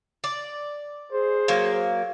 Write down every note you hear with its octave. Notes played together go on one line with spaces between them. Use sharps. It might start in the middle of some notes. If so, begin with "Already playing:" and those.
D5
G#4 C5
F#3 A#3